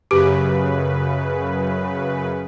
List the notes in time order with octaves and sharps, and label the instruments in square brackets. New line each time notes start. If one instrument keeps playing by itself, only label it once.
[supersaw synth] F#2 C#3 B4 [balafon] G4